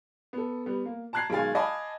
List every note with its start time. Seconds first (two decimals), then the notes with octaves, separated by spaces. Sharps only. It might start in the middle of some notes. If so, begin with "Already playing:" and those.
0.33 B3 A4
0.66 G3 B3
0.85 A#3
1.13 A5 A#5 F#6 G#6 C7
1.30 B1 D#3 G#3 F5 G#5 A6
1.55 D#5 F5 G#5 A5 B5 D6